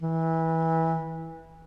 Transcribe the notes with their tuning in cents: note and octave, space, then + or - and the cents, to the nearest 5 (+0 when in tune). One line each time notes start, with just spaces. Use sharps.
E3 -20